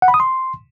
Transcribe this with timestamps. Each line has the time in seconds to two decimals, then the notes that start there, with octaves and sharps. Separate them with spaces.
0.02 F#5
0.08 B5
0.14 D#6
0.20 C6